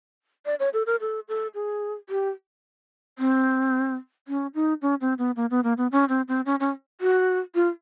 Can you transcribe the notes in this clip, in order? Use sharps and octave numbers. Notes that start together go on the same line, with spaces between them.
D5
C#5
A4
A#4
A4
A4
G#4
G4
C4
C#4
D#4
C#4
C4
B3
A#3
B3
A#3
B3
C#4
C4
C4
C#4
C#4
F#4
F4